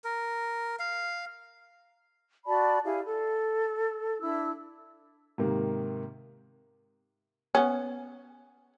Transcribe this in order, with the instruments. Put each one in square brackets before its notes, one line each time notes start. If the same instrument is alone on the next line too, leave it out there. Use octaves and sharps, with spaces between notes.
[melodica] A#4
F5
[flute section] F#4 D5 A5 B5
E4 G4 G#4 F5
A4
D4 E4 E6
[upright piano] G#2 C3 D#3 A#3
[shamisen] B3 C#4